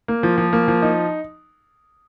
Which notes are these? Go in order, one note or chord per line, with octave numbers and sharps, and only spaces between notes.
A#3
F3
F3
A#3
F3
D#4